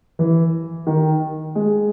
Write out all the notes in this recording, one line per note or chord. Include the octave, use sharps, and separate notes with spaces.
E3
D#3
G#3